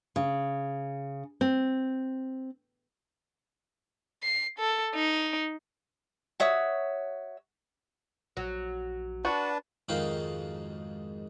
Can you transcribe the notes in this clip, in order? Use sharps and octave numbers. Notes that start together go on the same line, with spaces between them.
C#3
C4
C7
A4
D#4
F#4 C#5 E5 D#6
A#1 F#3
D4 F#4 B4 A5
F2 G#2 D#3 F#4 F5 G5